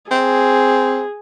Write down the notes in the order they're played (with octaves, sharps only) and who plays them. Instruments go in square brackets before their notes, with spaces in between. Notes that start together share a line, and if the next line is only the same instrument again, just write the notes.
[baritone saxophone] C4 [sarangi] G#4